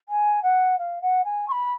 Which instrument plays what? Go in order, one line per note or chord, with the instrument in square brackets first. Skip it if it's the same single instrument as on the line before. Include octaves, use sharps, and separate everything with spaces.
[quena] G#5
F#5
F5
F#5
G#5
C#6
B5